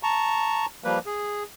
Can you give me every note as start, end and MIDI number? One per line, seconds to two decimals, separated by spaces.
0.03 0.66 81
0.03 0.66 82
0.03 0.66 85
0.84 0.99 53
0.84 0.99 55
0.84 0.99 58
0.84 0.99 71
1.06 1.43 68